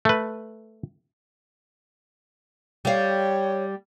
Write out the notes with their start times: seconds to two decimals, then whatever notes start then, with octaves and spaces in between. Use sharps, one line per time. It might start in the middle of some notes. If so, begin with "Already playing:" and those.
0.05 A3 B4
2.85 G3 C#5 F5